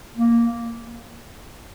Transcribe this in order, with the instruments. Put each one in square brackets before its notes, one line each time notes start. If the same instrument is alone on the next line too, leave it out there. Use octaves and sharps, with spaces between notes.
[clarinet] A#3